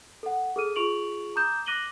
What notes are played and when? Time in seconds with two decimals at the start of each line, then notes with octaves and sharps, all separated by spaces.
0.23 A4 F#5
0.56 G#4 A4 F6 D#7
0.76 F4 G#4 C#6 D7 F7 F#7
1.36 A#5 D6 D#6 G6 E7
1.66 D6 F#6 A#6 D#7 F#7 G7